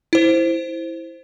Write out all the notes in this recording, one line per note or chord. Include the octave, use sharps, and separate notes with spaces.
E4 C5